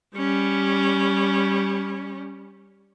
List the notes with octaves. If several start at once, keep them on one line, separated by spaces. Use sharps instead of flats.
G3 C#4